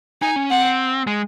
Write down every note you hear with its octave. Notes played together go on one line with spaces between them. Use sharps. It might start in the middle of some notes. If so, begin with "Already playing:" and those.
D#4 G#5
C#4
C4 F#5
G#3